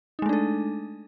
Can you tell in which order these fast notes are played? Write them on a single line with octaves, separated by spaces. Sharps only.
D#4 G#3 A3 D4 A4